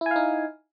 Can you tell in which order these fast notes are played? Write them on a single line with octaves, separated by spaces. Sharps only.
E4 G#5 F5 D#4